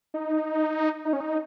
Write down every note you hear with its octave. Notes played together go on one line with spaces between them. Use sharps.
D#4
D#4
C#4
D#4